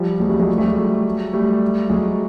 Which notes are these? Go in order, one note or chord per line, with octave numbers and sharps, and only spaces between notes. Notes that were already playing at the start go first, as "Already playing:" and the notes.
Already playing: F3 G3
F#3 G#3
G3 A3
F#3 G#3
G3 A3
F#3 G#3
G3 A3
F#3 G#3